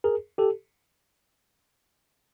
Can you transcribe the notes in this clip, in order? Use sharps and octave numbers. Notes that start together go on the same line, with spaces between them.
G#4 A#4
G4 A4